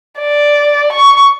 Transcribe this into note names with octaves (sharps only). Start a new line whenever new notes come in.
D5
C#6